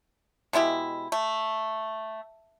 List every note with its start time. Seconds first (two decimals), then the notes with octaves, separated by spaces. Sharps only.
0.53 B2 G#3 E4 G4
1.12 A3